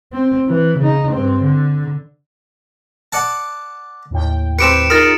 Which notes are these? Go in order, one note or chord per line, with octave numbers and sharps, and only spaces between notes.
C4
E3
C#3 D#4
G2 C4
D3
D5 F#5 A5
D#2 A2 G5
C4 G4 B4 C#7 D7 E7
D#4 F4 G#4 A#4 D#6 A6